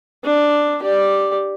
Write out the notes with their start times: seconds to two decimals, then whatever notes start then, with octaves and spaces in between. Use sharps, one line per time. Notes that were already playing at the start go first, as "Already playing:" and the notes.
0.24 D4
0.83 G4 D5